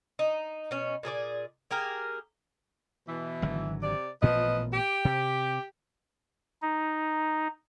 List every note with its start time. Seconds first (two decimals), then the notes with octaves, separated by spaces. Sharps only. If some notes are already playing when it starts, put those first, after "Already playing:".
0.19 D#4
0.71 B2 C#4
1.03 A#2 G#4 A4 D5
1.71 A#3 G4 G#4 A#4
3.08 B2 E3
3.42 G#1 D3 F#3
3.83 C3 D5
4.22 A1 A#2 F3 B3 B4 D#5
4.73 G4
5.05 C3
6.62 D#4